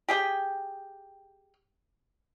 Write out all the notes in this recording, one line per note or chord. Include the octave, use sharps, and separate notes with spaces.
G4 G#4 G5